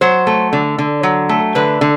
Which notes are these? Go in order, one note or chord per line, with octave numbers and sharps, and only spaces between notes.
F#3 C5
A3
D3
D3
F#3
A3
D3 B4
D3